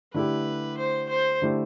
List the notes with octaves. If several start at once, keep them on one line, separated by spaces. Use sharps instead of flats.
D3 A3 E4 G4 B4
C5
C5
D3 A3 E4 G4